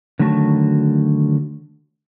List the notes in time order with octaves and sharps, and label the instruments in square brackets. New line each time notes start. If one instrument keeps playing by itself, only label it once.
[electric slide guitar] D3 D#3 F#3 A3 F#4 A5